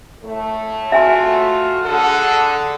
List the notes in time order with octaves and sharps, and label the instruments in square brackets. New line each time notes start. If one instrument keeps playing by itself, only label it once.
[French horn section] A2 A3
[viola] F4 F#4 [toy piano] E5 G#5 C6
[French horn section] D3 [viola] G#4 F#5 [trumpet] A4